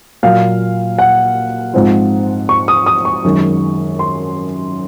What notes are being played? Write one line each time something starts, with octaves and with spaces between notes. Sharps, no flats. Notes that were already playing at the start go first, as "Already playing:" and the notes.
A#2 F#3 A#3 F5
F#5
G#2 F3 C4 F4
C#6
D#6
D#6
C#6
F#2 D#3 G#3
C6